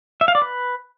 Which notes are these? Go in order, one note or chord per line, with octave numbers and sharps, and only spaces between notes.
E5
F5
D5
B4